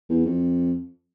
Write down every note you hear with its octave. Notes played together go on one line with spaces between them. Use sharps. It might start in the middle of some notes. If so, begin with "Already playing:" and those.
E2
F2